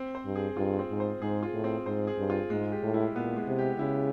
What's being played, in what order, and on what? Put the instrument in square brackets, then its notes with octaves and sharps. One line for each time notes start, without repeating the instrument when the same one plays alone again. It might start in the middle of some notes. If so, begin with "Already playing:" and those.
Already playing: [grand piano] C4
C5
[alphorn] G2
[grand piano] G#4
[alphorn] G2 [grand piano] F4
[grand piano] C4
[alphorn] G#2
[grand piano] C5
[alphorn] G#2 [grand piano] G#4
[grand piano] F4
[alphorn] A2
[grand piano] C4
[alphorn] G#2 [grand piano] C5
[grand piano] G#4
[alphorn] G2
[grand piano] F4
[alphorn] G#2 [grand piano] G#3
[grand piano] G4
[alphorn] A2
[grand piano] E4
[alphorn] A#2 [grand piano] B3
[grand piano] G#3
[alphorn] C3
[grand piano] G4
[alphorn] C#3 [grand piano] E4